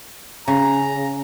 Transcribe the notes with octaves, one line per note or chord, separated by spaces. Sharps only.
C#3 A#5